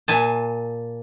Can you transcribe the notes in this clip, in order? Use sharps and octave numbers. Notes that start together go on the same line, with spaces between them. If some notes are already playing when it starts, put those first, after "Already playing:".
A#2 G#5 A5